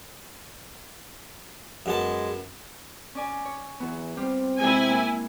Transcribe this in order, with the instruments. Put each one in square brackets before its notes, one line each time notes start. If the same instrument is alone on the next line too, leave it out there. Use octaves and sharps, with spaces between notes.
[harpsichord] F#2 B3 A5 [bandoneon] G#3
[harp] C#4 D5 G#5
C#5
[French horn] E2 [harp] F#3 B3
[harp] G3 F4 G4 [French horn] C4
[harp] C3 G#3 [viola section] E4 G#5
[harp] A#3